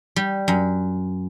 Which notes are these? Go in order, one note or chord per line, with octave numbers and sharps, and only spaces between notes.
G3
F#2